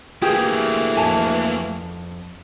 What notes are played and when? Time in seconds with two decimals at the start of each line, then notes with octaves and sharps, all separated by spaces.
0.22 D2 E3 A3 A#3 G4 G#4
0.96 F2 G#5 A5